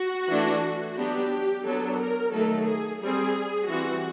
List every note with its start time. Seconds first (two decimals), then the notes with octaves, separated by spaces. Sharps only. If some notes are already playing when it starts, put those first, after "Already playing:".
Already playing: F#4
0.29 E3 A3 D4
0.97 F#3 B3 D4 G4
1.65 F#3 B3 D4 A4
1.99 A#4
2.33 D#3 F#3 A3 A4
2.67 G#4
3.01 G3 C4 G#4
3.68 E3 G3 C4 F#4